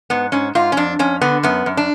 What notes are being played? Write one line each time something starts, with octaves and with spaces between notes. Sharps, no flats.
G#2 B3
G#2 C#4
G#2 F4
C#4
F2 D4
F2 C#4
D3 B3
F#2 B3
F#2
D4